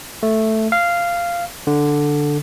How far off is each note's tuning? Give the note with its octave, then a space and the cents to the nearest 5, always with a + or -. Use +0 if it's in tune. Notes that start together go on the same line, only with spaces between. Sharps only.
A3 +0
F5 -10
D3 +0